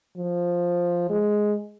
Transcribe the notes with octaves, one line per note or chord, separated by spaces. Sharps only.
F3
G#3